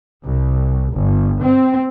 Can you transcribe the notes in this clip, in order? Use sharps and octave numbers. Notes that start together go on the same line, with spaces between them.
C2
G1
C4